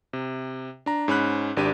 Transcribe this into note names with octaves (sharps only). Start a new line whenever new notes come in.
C3
D4 A#5
G#2 C#4 B5 F#6
G#1 D4 G4 D#7